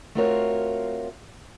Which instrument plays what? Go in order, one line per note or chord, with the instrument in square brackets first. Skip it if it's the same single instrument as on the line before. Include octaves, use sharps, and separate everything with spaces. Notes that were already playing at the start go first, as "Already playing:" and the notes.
[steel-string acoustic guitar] A3 C4 F4 F#4 A#4 C#5